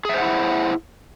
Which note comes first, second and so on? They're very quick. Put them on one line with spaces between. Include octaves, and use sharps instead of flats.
G#4 E5 C5 F#5 E4